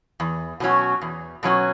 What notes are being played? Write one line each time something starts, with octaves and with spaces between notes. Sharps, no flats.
E2
B2 F#3 C#4 F#4
E2
B2 F#3 C#4 F#4